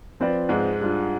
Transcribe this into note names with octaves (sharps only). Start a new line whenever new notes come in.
F3 C4 F4 B4 D5
G#2 G#3
G3 D4 F4